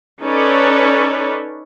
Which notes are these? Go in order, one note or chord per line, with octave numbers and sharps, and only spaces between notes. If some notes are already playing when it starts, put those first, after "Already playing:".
C#4 D#4 A4 B4 C#5 D5